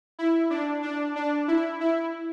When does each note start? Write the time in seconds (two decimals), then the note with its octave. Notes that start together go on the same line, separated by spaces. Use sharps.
0.19 E4
0.50 D4
0.83 D4
1.16 D4
1.48 E4
1.81 E4